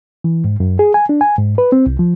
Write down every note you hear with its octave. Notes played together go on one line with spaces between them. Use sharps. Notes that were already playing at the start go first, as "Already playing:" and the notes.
E3
G#2
F#2
G#4
G#5
D4
G#5
G#2
B4
C4
C2
F3